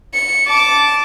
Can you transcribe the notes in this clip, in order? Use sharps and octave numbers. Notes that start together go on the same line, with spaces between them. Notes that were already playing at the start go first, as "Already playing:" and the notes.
C#7
A5 D6